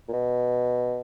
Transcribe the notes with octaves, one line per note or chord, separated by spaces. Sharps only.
A#2
B2